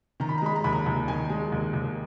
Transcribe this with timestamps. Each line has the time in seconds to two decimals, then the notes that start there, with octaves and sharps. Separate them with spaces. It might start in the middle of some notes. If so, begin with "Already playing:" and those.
0.20 D#3 A#5
0.29 B5
0.38 A#5
0.42 G#3 B5
0.56 A#5
0.64 D#2 B5
0.73 A#5
0.86 D#2
1.08 D#3 G#5
1.30 G#3
1.52 D#2
1.73 D#2